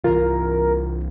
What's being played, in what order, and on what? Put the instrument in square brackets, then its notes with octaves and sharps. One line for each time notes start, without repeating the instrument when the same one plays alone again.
[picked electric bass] C2 C3 E3 [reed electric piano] F4 [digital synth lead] A#4